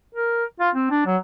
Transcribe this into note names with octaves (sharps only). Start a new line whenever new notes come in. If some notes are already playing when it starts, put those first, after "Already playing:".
A#4
F4
C4
D4
F#3